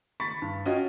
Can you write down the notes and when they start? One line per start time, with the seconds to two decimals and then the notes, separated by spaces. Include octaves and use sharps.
0.20 B5 C#6 A6 B6
0.42 G2
0.66 C#4 F4 F#4 D#5 G5